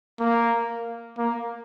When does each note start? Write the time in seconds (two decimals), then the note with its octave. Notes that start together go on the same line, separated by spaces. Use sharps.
0.20 A#3
1.18 A#3